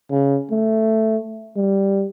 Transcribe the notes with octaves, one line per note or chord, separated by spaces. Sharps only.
C#3
A3
G3